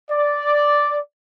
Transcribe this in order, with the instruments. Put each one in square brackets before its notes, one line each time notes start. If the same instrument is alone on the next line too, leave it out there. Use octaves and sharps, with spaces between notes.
[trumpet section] D5